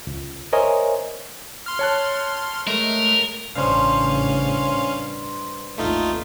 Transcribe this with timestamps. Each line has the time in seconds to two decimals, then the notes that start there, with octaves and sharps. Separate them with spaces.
0.07 C#2
0.53 A#4 C5 C#5 D#5 E5 G#5
1.66 C6 F6
1.79 C#5 A5 F#6
2.67 G#3 A3 A#4
3.55 A1 G2 C#3 C#4 C5 F5
5.78 G#1 D#2 A3 D#4 F4